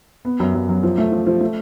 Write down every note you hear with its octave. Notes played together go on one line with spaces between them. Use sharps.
B3
F#2
F#2
F#3
F3
A3
F3
F3
A3